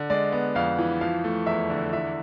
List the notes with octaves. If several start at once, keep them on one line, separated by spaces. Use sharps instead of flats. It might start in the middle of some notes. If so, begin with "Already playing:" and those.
Already playing: D3
G#3 D5
B3
F2 F5
E3
F3 F5
A3
E2 E5
D3
E3 E5